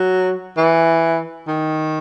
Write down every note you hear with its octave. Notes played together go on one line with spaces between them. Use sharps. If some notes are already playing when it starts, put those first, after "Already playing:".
Already playing: F#3
E3
D#3